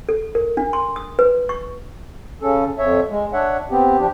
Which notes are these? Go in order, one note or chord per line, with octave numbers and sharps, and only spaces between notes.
A4
A#4
D4
C6
D#6
B4
C#6
C#3 C#4 A4
F2 C#5 E5
G#3
D4 C#5 E5 F#5
B3 C4 G4
F3 D4 G4